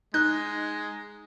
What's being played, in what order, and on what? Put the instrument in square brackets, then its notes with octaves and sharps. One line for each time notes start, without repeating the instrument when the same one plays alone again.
[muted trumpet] G#3 [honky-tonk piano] D#4 [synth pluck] F#6